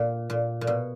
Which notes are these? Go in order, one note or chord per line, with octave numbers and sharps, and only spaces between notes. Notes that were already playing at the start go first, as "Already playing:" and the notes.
Already playing: A#2
A#2
A#2
B2